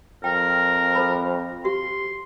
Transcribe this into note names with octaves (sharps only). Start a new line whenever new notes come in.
F2 A#4 G5
A4 C5 B5
G4 C6